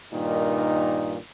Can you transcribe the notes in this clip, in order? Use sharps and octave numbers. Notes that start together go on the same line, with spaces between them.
G2 A#2 D#3 D#4